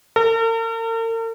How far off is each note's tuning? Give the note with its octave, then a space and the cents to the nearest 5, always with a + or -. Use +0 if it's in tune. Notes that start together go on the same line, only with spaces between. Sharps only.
A#4 -45